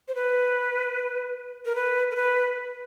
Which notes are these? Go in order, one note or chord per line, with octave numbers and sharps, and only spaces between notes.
C5
B4
A#4
B4
A#4
B4